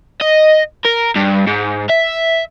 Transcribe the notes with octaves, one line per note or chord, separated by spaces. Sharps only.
D#5
A#4
G2
G#2
E5